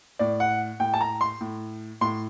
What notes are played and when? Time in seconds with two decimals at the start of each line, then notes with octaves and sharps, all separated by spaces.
0.19 A2 D5
0.40 F#5
0.80 A2 G5
0.94 A5
1.01 A#5
1.21 C6
1.41 A2
2.01 A2 C6